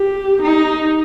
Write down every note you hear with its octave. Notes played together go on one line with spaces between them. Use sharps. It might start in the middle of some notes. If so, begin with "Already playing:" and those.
Already playing: G4
D#4